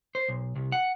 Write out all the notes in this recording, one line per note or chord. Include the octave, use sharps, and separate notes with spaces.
C5
B1
C2
F#5